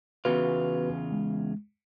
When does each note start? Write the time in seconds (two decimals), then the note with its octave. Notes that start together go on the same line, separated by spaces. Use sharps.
0.25 E2 C#3 B3 F4 F#4 B4
1.12 G#3